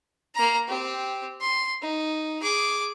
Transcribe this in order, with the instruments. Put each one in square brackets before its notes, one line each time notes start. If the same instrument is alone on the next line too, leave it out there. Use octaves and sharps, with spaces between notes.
[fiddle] A#3 A#5
C4 G4
C6
D#4
G#4 D6